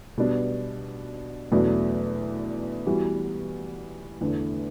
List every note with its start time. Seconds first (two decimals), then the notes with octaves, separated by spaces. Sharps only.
0.18 B2 G3 B3 D4
1.51 E2 B2 F#3 A3 D4
2.86 E3 G3 B3 F#4
4.21 E2 D3 A3